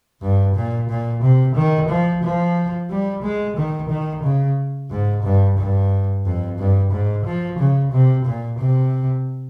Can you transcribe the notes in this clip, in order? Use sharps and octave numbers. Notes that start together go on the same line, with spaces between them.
G2
A#2
A#2
C3
D#3
F3
F3
G3
G#3
D#3
D#3
C#3
G#2
G2
G2
F2
G2
G#2
F3
C#3
C3
A#2
C3